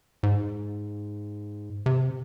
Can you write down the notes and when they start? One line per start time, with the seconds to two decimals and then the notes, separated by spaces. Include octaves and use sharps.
0.23 G#2
1.86 C3